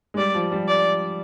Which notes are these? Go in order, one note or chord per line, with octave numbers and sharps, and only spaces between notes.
G#3
G3 D5
F3
G3
D5